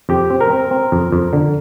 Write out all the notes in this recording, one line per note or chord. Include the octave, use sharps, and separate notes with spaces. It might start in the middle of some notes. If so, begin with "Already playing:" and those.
F2 G4
C4
A#4
C4
C4
F2
F2
D3